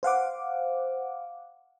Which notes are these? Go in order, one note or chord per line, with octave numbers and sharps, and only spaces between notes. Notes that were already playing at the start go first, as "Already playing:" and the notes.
C5 F5 F#5 D6